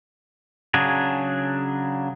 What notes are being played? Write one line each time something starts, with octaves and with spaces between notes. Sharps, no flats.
C#3 F#3 D4 G#4